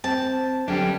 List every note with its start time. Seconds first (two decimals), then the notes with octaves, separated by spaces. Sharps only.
0.04 C4 A5
0.68 D3 F#3 C#4 D4 G4